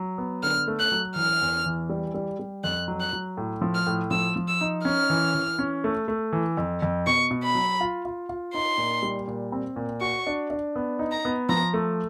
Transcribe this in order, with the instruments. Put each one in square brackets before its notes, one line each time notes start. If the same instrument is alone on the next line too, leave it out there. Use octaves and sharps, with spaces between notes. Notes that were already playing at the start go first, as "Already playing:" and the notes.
Already playing: [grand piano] F#3
B3
[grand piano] D3 [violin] F6
[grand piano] A3
[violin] F#6
[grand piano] F#3
[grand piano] E3 [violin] F6
[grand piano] E2
E3
G3
G3
G3
[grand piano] F2 [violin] F#6
[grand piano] F#3
[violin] F#6
[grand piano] F#3
A2
F3
[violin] F6
[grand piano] A2
[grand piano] F3 [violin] E6
[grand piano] F3
[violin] E6
[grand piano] D#4
[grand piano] C#4 [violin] F6
[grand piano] E3
E3
C#4
A3
A3
E3
F2
F2
[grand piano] B2 [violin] C#6
[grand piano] B2
[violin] B5
[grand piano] F#3
F4
F4
F4
[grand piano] D#4 [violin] C6
[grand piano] A#2
G3
A#2
C4
A#2
[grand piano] F#4 [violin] C#6
[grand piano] D4
D4
B3
D#4
[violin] A#5
[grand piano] B3
[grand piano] F3 [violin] A#5
[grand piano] A3